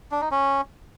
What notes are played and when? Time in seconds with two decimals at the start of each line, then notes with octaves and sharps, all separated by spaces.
0.11 D4
0.21 D#4
0.31 C#4